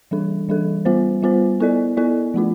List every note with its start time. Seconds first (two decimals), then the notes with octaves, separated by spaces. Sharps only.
0.11 E3 G3 D4 A4
0.49 E3 G3 D4 A4
0.85 G3 B3 F4 C5
1.23 G3 B3 F4 C5
1.60 B3 E4 A4 D5
1.97 B3 E4 A4 D5
2.34 F3 A3 D4 F4